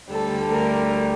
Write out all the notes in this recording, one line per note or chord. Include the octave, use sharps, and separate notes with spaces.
D2 D3 G3 A4
A#4